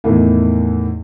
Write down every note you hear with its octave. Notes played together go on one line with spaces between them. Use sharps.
E2 A2 D#3